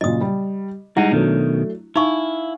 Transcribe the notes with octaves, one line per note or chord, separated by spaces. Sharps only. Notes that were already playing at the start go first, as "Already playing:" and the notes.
A#2 C#3 F#3 D#5 D#6
G3
G3 G#3 D#4 E4 F#5
B2 D#3 F#3 A3 D4
D#4 E4 F5 G#5 C#6